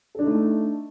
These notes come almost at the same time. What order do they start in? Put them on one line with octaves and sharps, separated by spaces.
A4 D4 D#4 A3